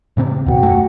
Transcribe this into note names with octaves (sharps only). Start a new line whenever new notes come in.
A2 C#3 C4
D#2 B2 F#4 F#5 G5
F#2 A3